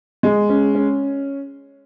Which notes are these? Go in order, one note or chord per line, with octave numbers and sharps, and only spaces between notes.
G#3
C#4
C#4